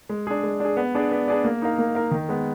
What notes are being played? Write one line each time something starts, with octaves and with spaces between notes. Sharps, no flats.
G#3
D4 G#4
G#3
D4 G#4
B3
D4 G#4 D5
B3
D4 G#4 D5
A#3
D#4 A#4 F5
A#3
D#4 A#4 F5
D#3
G#3 B3